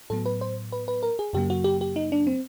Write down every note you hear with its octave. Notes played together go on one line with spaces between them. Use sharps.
A2 F#3 B3 A4
B4
C5
B4
B4
A#4
G#4
F#2 C#3 F#3 A#3 G4
F#4
G4
G4
D#4
D4
C4